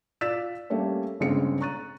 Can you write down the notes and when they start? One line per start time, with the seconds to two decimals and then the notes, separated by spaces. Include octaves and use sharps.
0.21 F4 D5 E6 A6 B6 E7
0.70 G3 A3 A#3 C#4
1.20 G1 C#3 G#3 C4 C#7
1.61 A#5 C#6 F#6 A6 D#7